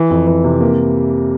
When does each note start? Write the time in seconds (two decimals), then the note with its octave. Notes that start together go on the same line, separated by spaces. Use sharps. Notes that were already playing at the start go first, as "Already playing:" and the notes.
Already playing: E3
0.10 F2
0.27 E3
0.44 C3
0.61 A#3